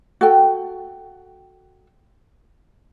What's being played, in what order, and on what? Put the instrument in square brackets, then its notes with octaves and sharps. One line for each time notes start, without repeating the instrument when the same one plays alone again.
[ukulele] F#4 A4 G5